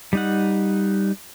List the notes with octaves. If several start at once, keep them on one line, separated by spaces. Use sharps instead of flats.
G3 D#4 F#5